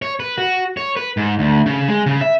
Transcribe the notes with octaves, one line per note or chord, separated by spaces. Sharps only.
C#5
B4
F#4
C#5
B4
G#2
D2
C#3
G#3
C#3
E5